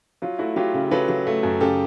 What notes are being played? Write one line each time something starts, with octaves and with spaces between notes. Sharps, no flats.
F#3 F4
A3 E4 F#4
F#3 F4 G4
C#3
F#3 A4 B4
F#3
A3
F#2
C#3 G4 A4